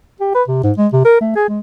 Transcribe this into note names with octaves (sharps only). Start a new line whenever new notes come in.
G4
B4
C3
G#2
G#3
C3
A#4
A3
G#4
G#3